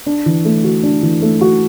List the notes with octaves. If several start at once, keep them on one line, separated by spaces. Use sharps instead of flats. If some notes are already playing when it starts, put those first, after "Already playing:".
D4
E3
A3
F#4
D4
E3
A3
F#4